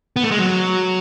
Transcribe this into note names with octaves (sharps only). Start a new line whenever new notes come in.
B3
A3
G#3
F#3